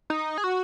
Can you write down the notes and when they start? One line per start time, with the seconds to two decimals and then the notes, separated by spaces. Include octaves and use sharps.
0.10 D#4
0.38 G#4
0.44 F#4